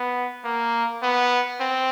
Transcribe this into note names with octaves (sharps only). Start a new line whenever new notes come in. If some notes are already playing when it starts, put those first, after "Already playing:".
Already playing: B3
A#3
B3
C4